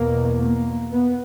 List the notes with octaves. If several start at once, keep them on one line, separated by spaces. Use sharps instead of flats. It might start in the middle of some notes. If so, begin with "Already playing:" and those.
Already playing: E2 B2 A#3
A#3
B3